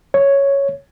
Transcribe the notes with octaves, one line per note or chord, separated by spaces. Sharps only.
C#5